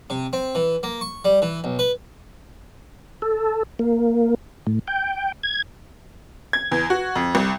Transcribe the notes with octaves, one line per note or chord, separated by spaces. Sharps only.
C3
C4
E3
A#3
C#6
G3
E3
B1
B4
A4
A#3
A2
G5
G#6
G#6
E2
F#4
F2
C2